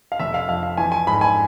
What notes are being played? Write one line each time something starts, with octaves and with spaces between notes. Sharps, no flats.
F5
F1 E5
F5
F2 F5
F5
E3 G#5
G#5
G#2 B5
G#5